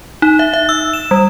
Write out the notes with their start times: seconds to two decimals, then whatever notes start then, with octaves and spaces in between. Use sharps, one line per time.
0.22 D#4
0.39 E5
0.54 E5
0.69 E6
0.93 E7
1.11 G3